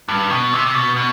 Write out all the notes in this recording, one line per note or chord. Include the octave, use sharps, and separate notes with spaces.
G2
B2
C3
C3
B2
B2